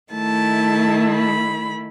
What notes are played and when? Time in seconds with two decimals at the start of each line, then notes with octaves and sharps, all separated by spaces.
0.12 D#3 A3 E4 A5
1.14 B5